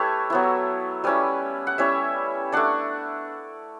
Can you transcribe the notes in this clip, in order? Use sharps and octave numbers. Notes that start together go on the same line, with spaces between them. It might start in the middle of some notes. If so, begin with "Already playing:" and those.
Already playing: A3 E4 G4 A4 B4 C#5
F#3 B3 E4
G3 C#4 E4 B4 D5
F#5
G3 C#4 E4 C#5 E5
A3 D4 D5 F#5